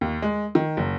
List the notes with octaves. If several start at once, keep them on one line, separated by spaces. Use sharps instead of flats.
D#2
G#3
D#3
F#1